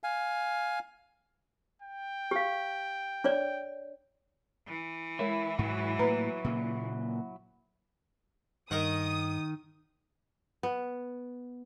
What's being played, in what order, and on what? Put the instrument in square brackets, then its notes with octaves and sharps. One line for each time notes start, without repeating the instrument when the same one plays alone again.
[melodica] F5 G#5
[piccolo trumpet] G5
[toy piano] G4 F5
D4 C#5 D5
[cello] E3
[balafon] G#3 A#4 C#5 [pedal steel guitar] E4
[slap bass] G#2 [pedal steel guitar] F#3 E4 F#4
[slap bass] A2 A#3 [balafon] B4 A#5 B5
[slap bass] A#2 C#3 A#3
[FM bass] G2 [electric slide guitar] D#3 [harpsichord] A#4 D#5 F#5 [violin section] D#6
[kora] B3